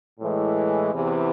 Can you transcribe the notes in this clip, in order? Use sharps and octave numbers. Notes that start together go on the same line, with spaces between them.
A2 E3 G#3
E2 C3 E3